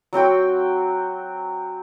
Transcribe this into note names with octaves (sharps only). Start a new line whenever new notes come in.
F#3 C4 F#4 G5